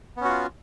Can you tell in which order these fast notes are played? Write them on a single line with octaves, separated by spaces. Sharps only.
B3 C#4 F#4 F4